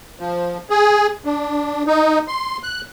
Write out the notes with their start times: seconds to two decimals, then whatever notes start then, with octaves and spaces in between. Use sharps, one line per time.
0.19 F3
0.70 G#4
1.25 D4
1.87 D#4
2.28 C6
2.63 F#6